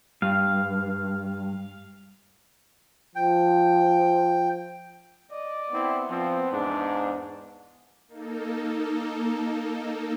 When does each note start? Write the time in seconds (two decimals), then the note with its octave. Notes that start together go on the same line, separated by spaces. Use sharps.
0.22 G2 F5
3.15 F3 G5
5.31 D5 D#5
5.73 B3 C4 E4
6.10 F3 C4
6.52 E2 G#2 D4
8.08 A#3 D#4 A4